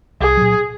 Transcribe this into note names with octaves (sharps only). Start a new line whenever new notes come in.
C2 G#4
A#2 F#3